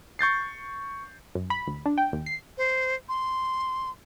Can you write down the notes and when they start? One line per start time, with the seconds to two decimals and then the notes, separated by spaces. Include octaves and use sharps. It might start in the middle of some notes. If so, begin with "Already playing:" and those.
0.19 C#6 G6 A6 C7
1.35 F#2
1.50 B5
1.67 D2
1.86 D4
1.98 G5
2.13 D#2
2.26 C7
2.58 C5
3.09 C6